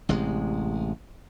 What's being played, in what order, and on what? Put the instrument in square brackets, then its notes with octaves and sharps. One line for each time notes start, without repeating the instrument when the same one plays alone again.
[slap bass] A1 C3 G#3